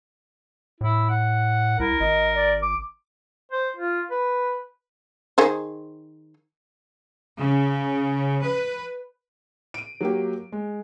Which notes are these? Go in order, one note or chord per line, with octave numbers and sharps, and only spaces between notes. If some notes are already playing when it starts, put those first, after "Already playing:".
A2 E4
F#5
C2 E4 A#4
G#1 D#5
D5
D6
C5
F4
B4
D#3 G#4 C5
C#3
B4
D7 D#7
F#3 A#3 G4
G#3